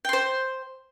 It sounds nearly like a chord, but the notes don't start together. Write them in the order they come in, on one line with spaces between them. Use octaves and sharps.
G5 C6 C5